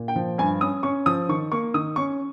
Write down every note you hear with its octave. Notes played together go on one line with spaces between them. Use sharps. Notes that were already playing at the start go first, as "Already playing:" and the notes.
Already playing: A#2
G5
F3
G2 G#5
C#4 D#6
C#4 C#6
F3 D#6
D#3 C#6
A#3 C#6
D#3 D#6
C#4 C#6